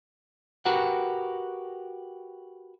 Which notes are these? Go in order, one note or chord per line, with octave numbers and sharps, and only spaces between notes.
F#4 G4 A#4 B4 F#5